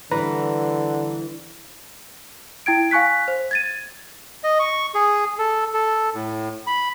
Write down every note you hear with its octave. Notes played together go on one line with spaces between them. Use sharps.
D3 E3 G3 B4 A#5
E4 G5 G#6 D7
F5 G#5 C#6 F#6 B6
C5
G#6 A6 D#7
D#5
C#6
G#4
A4
A4
A2
B5